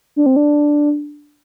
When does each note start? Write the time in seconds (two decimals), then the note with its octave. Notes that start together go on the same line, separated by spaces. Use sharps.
0.16 D4
0.26 C4
0.36 D4